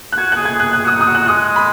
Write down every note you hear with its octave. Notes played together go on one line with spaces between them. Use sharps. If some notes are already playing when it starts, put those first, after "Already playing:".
F#6
F#4 G#6
G#4 F#6
G#6
G#4
F#6
G#4 F#6
F#4 D#6
D#4 D#6
F#4
F#6
G#3 D#6
B5